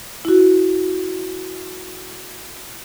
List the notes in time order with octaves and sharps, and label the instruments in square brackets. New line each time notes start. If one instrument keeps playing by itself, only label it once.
[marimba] E4 F#4